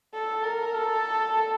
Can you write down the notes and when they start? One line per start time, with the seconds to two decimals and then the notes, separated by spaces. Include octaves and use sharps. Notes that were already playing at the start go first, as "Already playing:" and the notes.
0.14 A4
0.44 A#4
0.75 A4